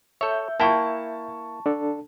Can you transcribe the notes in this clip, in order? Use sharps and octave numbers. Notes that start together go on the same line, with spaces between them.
A4 C#5 E5 G6
A#3 E4 G5 A5 C#6
D4 A4